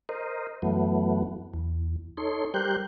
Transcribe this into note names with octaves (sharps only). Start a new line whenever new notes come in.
A#4 C5 D#5
F#2 E3 F#3 A3 B3
E2
D#4 A4 C#5 C6
G3 G4 A#4 C5 F#6 G6